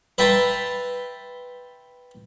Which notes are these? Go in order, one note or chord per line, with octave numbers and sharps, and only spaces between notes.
B4 E5 G5 A5 A#5 C6